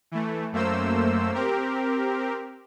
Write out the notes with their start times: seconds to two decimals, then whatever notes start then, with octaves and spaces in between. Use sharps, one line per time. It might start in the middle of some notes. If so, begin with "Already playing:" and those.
0.11 E3 A3
0.52 F#2 A3 A#3 C5 E6
1.34 C4 G4 A#4